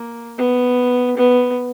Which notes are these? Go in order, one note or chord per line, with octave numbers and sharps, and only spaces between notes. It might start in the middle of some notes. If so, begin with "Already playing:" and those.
Already playing: A#3
B3
B3